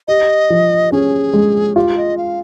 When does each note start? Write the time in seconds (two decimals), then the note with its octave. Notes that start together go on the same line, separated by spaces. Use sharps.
0.08 G4 D#5
0.50 F3
0.92 C#4 G#4
1.33 G#3
1.76 F4 G4
1.97 D#5
2.17 F5